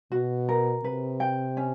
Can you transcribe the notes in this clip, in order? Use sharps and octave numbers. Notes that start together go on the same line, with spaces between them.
B2 F#4
A#4
C3 B4
G5
C#4